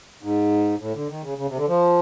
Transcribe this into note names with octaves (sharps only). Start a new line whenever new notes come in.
G#2
A2
D3
D#3
C#3
C#3
C3
D3
F3